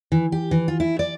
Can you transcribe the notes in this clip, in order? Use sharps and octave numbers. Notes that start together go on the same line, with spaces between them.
E3
G4
E3
F4
E4
D5